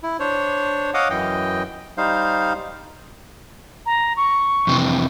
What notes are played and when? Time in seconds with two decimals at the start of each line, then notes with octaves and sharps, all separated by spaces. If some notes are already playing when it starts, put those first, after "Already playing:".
0.03 E4
0.20 D4 C5 C#5
0.94 C#5 D#5 F5 F#5 D6 D#6
1.10 F#2 E3 D#5 G5
1.98 G3 D#4 C5 F5
3.86 A#5
4.17 C#6
4.67 F2 C3 E3